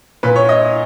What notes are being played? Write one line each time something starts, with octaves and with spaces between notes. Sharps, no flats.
A#2 B4
C#5
D#5